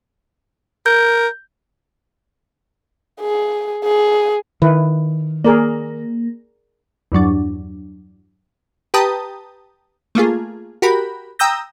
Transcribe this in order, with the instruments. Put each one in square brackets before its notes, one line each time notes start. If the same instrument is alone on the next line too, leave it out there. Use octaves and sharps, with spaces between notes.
[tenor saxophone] A#4 [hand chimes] G6
[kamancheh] G#4
G#4
[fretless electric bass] D#3 [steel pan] E4 B4
[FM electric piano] A#3 [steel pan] G#4 A#4 D5
[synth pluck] E2 G2 F#3 D4
[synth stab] G4 B4 G5 A5 A#5 D#6
A3 A#3 F4 G#4
F#4 G4 A#4 B5
G5 A#5 D#6 E6 G6 A#6